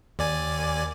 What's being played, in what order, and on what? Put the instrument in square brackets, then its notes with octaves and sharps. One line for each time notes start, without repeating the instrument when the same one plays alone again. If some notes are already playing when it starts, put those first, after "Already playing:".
[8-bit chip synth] D#2 D5 G#5